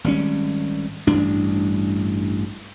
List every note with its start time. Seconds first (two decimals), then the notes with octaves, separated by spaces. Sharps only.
0.04 G#1 G3 C#4
1.07 A1 G2 D4